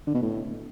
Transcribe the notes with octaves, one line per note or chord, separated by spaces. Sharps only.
D3
B2
A2